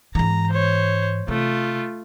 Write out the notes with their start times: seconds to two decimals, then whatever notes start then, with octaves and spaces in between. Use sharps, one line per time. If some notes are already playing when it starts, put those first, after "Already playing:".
0.15 G#2 E3 A#5
0.51 C5 C#5
1.28 C3 A3 F4